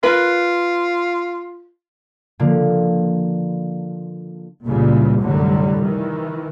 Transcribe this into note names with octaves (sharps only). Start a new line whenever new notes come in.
F4 A#4 B4
D3 F3 A#3
C#2 A#2 C#3 E3 G3
C2 F#2 A2 D3 F#3 G3
D#3 E3